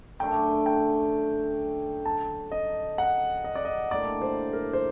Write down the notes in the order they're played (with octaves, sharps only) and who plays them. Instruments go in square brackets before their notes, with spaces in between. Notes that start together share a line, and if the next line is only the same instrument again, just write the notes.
[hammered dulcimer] F#2 D3 A3 D4 [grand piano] G5
[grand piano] G5
A5
D#5
F#5
D#5
D5
D#5
[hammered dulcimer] A2 G3 A#3 D4 [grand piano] D5
[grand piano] C5
A#4
C5